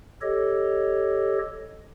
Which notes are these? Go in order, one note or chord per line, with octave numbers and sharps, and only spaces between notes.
G4 A4 C#5 D#5